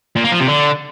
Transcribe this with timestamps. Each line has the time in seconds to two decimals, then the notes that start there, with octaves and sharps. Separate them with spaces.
0.17 A#2
0.24 A#3
0.32 F3
0.40 C3
0.48 D3